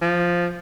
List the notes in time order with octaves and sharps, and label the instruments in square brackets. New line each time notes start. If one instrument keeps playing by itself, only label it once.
[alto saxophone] F3